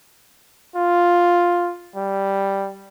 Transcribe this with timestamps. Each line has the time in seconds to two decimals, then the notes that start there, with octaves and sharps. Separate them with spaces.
0.76 F4
1.96 G3